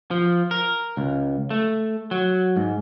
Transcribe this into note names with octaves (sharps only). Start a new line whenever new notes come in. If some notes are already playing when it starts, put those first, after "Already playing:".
F3
A#4
C#2
A3
F#3
G#2